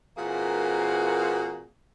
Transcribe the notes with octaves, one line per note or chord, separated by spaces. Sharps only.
A#2 E3 A#3 C4 F#4 G#4